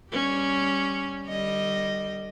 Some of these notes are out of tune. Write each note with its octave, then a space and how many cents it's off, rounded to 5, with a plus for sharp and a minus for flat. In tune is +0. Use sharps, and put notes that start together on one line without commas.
G3 +0 C#4 +0
D3 +40 G3 +0 D#5 +0